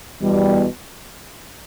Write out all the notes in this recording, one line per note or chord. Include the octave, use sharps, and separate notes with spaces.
E2 B2 G3